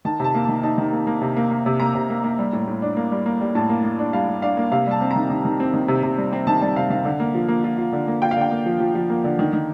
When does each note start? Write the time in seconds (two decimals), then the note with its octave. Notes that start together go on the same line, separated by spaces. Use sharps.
0.05 D#3 A5
0.20 C3 A5
0.35 A#3
0.44 D#3 A5
0.63 D#4 A5
0.78 D#3
0.93 A#3
1.07 A#3
1.22 C3
1.36 A#3
1.51 A#3
1.66 C3
1.80 A#3 A#5
1.95 C3
2.10 A#3
2.24 A#3
2.39 G3
2.53 A2
2.67 A2
2.82 D4
2.97 A#3
3.12 G3
3.26 A#3
3.41 G3
3.55 A2 A5
3.70 A#3
3.84 A#3
3.99 D4
4.13 G3 F5
4.28 G3
4.42 D4 F5
4.57 A#3
4.71 C3 F5
4.87 G3 A5
5.01 C4
5.11 A#5
5.16 D#3
5.30 D#3
5.45 D#3
5.60 C4
5.74 D#3
5.88 C3
6.03 C3
6.18 G3
6.33 C4
6.47 D#3 A5
6.61 G3 A5
6.76 C3 F5
6.90 D#3 F5
7.05 D3
7.20 A#3
7.34 F3
7.48 A#3
7.64 F4
7.78 F4
7.93 D3
8.08 A#3
8.22 F4 G5
8.31 F5
8.36 D3 G5
8.51 A#3
8.66 F3
8.80 F3
8.95 F3
9.10 A#3
9.24 D3
9.39 D#3
9.53 D#3